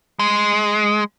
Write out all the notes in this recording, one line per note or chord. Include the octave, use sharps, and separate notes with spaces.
G#3